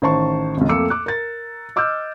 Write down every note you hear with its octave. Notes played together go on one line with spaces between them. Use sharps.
A1 D#3 C5 A5 C#6
G#1 C#2
F2 A3 A#3 D6 E6 C#7
D6 F#6
A#4 A6
D#5 D6 E6 F6 G6